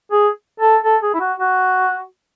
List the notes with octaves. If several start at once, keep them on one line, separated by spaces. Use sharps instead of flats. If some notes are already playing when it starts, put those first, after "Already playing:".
G#4
A4
A4
G#4
E4
F#4
F#4